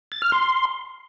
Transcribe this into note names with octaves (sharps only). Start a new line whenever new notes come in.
A6
F6
C6